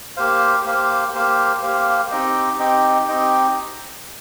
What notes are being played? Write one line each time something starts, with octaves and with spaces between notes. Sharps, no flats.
A#3 G4 C5 F5
A#3 G4 C5 F5
A#3 G4 C5 F5
A#3 G4 C5 F5
C4 D#4 G4 D#5 G5
C4 D#4 G4 D#5 G5
C4 D#4 G4 D#5 G5